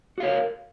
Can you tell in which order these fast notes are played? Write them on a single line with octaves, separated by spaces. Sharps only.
F#4 F5 C#5 A#4